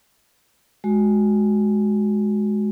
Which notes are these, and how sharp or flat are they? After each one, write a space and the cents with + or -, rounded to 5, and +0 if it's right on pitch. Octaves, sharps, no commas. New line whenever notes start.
G#3 +10 F#4 +0